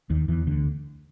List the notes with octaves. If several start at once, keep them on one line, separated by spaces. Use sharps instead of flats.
D#2 D#3
E2 E3
D2 D3